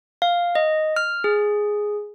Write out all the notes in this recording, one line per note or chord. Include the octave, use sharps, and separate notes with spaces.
F5
D#5
F6
G#4